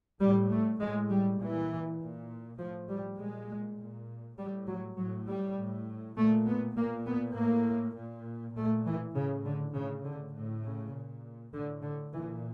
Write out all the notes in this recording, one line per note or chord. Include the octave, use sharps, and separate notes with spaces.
A2 G3
A3
A2 G#3
G3
A#2 E3
A#2
A2 F3
G3
A#2 G#3
A#2
A2 G3
F#3
A2 F#3
G3
A2
A#2 A3
B3
A#2 A#3
B3
A2 A#3
A#2
A#2 A3
E3
A2 C#3
D3
A2 C#3
D3
A2
C#3
A#2
A2 D3
D3
A#2 E3